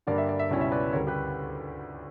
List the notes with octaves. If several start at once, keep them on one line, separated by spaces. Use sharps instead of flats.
G2 D3 G3 A#3 D5
E5
D5
E5
C#2 B2 G3 C#4 E4 D5
E5
B4 D5
D2 C#3 G3 A#4 C#5
G4 B4